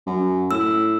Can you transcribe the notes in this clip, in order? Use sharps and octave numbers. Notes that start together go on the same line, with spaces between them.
F#2
A2 E6